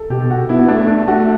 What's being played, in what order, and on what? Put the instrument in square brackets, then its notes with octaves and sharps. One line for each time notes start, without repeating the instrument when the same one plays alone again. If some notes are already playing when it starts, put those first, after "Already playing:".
Already playing: [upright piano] A4
[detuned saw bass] B2 [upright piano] G4
[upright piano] F#4
[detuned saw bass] B3 [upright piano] E4
[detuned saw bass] A3 [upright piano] D4
[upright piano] D4
[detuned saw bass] A3 [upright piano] F#4